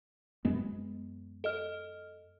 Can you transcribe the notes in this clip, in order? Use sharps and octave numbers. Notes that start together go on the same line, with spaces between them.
F#2 G#3 B3
A4 D#5 F6